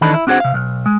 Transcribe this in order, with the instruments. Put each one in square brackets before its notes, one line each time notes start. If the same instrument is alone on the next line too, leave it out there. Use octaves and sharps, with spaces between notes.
[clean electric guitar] D#3 E3 D4 D#4 A4 B5
E4
C4 D4 F#4 G#4 C5 F#5
C3 F5
B1
G#3